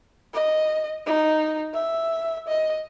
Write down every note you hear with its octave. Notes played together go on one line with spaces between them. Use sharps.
D#5
D#4
E5
D#5